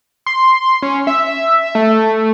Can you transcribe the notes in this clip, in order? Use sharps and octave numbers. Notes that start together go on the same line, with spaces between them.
C6
C#4
E5
A3